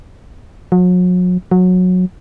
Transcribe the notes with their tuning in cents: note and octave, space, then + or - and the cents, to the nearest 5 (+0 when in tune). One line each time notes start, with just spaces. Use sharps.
F#3 -40
F#3 -20